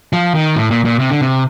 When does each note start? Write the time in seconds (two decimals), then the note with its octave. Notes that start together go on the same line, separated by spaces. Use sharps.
0.13 F3
0.34 D#3
0.56 A2
0.71 A#2
0.85 A#2
0.99 C3
1.10 D3
1.21 C3